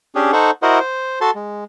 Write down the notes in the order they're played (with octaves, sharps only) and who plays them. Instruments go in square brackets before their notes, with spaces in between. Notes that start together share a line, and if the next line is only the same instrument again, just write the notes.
[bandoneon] C#4 D4 G4 G#4
D#4 A4 C5 F#5 C#6
E4 F#4 A#4 C5 D#5 F#5
C5
F#4 A4 A5 C6
G#3